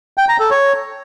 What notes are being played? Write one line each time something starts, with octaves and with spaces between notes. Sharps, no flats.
G5
A#5
A4
C#5